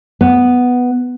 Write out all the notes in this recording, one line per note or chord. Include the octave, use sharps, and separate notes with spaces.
B3